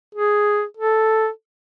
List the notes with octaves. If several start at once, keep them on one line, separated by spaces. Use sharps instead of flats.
G#4
A4